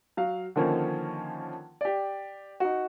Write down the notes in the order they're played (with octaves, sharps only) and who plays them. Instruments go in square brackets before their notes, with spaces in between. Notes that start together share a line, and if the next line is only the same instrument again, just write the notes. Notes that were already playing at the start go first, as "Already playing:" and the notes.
[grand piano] F#3 F5
D3 D#3 F3 A#3 C#4 D#4
G4 D5
D#4 F#4